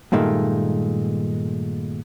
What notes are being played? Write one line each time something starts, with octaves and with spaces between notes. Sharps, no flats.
G2 A#2 D#3 G#3 A3